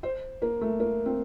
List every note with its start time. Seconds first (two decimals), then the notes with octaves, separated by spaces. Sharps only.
0.03 C5
0.42 A#3
0.61 A3
0.80 A#3
1.06 C4